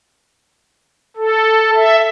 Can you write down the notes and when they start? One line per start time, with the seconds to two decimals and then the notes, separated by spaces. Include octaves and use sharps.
1.16 A4
1.75 E5